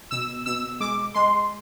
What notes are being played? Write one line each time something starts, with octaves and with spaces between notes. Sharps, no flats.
B2 E6
B2 E6
G#3 D6
G#3 C6